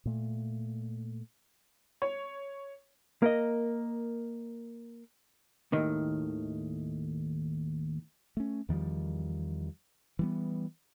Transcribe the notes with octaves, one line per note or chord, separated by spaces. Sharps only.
A#2 A3
C#5
A#3 A#4 D#5
D#2 A2 D#3
A3 C#4
E2 D#3 F3 G3
E3 G3 B3